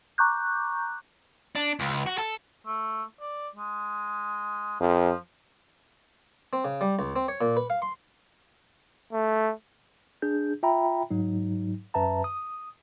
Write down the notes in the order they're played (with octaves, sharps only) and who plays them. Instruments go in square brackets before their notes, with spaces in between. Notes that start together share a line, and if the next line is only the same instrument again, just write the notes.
[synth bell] A#5 C#6 D6 F#6 G6
[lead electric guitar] D4
C#2
F#4
A4
[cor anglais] A3
D5
G#3
[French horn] F2 [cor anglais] F3
[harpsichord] C4
C#3
G3
C#2
C4
C#5
A#2
B4
F5
C6
[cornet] A3
[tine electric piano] D4 G#4 G6
F4 E5 G5 A#5 B5
G#2 F#3 D#4
F#2 B4 E5 A5 A#5
D#6